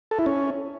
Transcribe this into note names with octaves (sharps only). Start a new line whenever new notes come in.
A4
E4
C#4